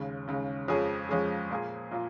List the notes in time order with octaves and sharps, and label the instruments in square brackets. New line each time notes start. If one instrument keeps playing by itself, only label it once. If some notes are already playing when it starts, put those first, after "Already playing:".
Already playing: [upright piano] D#2 C#3 G#3
D#2 C#3 G#3
F2 F3 G#3 C#4 G#4
F2 F3 G#3 C#4 G#4
A#2 A#3 F4 G#4
A#2 A#3 F4